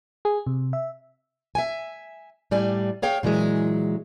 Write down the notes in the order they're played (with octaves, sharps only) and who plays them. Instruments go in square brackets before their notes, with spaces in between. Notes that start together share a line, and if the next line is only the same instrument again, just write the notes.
[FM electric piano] G#4
C3
E5
[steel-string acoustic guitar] E5 G5 G#5
A2 G3 D5 G#5
G#4 C#5 F5 G5
A#2 E3 F#3 G#3